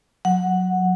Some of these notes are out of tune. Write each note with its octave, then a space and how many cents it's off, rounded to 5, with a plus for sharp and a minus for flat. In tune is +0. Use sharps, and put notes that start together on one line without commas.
F#3 -20 F#5 +0